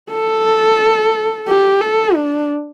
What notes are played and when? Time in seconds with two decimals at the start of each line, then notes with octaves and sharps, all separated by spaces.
0.12 A4
1.48 G4
1.81 A4
2.15 D4